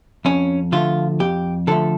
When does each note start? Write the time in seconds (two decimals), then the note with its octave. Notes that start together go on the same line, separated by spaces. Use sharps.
0.25 F2 C#4
0.72 D3 F3 A3 F4
1.20 F2 G4
1.67 D3 F3 A3 A4